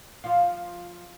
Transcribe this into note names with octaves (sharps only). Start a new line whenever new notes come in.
F3 F4